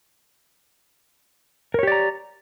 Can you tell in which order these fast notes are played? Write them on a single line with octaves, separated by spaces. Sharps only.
A#4 C#5 G4 D5 A#5